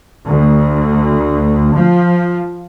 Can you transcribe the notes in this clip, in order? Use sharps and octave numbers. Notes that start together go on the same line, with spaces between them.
D2
F3